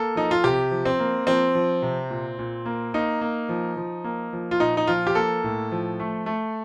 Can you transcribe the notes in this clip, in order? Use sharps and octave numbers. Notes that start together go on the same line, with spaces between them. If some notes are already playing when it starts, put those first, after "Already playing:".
Already playing: A#3 A4
F3 D#4
F4
C3 G4
F3
C4
A#3
F3 C4
F3
C3
A#2
A#2
A#3
A#3 D#4
A#3
F3
F3
A#3
F3
F4
A#2 D#4
D#4
F3 F4
G4
A#3 A4
A2
F3
A3
A3